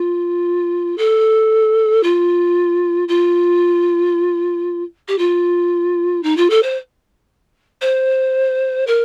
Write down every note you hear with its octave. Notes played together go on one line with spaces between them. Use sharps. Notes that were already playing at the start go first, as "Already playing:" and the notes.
Already playing: F4
A4
F4
F4
G4
F4
D#4
F4
A4
C5
C5
A#4